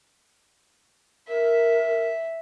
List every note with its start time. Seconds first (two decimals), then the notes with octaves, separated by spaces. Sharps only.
1.29 A#4 E5